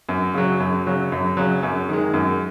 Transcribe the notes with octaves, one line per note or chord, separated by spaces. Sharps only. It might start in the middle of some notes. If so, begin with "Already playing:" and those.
F#2
C#3 F#3
F#2
C#3 F#3
F#2
C#3 F#3
F#2
D#3 G#3
F#2